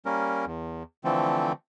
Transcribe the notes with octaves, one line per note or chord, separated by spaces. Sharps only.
G3 A#3 C#4 A#4
E2
D3 E3 F3 A3 C4 A4